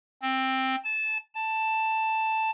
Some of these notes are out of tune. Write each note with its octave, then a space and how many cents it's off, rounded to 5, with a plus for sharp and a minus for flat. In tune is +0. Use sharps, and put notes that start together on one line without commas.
C4 +10
A5 -15
A5 +5